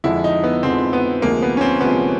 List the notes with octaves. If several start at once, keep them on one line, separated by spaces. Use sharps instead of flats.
F2 D3 F3 G#3 E4
D#4
B3
F2 D3 F3 G#3 C4
B3
D2 C3 F3 G#3 A#3
B3
C#4
C4
D2 C3 F3 G#3 B3